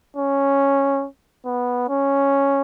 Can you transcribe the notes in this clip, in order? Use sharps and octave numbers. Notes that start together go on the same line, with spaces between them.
C#4
B3
C#4